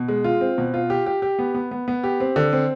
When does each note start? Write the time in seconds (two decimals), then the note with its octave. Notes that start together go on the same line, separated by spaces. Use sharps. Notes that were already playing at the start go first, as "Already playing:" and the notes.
Already playing: B2
0.08 G#3
0.24 F4
0.41 C4
0.58 B2
0.74 F4
0.90 G4
1.06 G4
1.22 G4
1.39 B3
1.54 B3
1.71 B3
1.88 B3
2.04 G4
2.20 C4
2.36 D3
2.53 C4